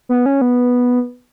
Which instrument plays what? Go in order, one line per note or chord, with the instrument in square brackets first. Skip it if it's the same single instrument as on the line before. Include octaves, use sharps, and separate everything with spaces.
[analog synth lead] B3
C#4
B3